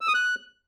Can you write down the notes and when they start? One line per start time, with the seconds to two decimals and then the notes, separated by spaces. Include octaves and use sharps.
0.01 E6
0.08 D#6
0.14 F#6